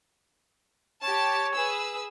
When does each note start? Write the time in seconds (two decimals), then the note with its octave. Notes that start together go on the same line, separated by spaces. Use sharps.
1.03 G4 C#5 A5
1.54 G#4 B4 E6